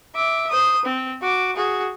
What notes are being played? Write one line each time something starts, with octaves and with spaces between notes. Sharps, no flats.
E5 D6
C5 D#6
C4
F#4 D6
F#4 G#4